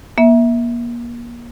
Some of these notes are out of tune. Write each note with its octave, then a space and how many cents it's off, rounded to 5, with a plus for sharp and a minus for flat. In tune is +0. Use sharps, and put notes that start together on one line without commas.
A#3 +35 E5 -10